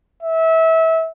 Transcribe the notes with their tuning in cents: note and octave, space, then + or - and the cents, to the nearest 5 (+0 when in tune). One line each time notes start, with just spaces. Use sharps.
E5 -25